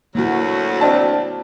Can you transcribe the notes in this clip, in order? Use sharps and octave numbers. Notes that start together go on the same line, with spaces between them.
D2 F#3 A#3 E4 F#4
C4 D4 A5